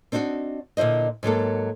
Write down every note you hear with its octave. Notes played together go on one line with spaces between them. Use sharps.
C4 D4 D#4 F4 F#4
A#2 D3 E4 C5 D#5
G#2 F#3 A#3 A4